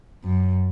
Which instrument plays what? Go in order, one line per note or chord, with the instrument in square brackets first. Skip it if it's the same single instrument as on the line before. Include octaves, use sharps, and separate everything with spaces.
[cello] F#2